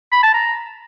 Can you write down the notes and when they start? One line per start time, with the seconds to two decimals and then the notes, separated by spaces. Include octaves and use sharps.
0.12 B5
0.23 A5
0.34 A#5